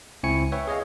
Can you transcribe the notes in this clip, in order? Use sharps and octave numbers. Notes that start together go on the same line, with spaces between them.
C#2 C4 E4 G#5 C#6 C#7
B4 C#5 E5 G5
G#4 C#5 D#5 F5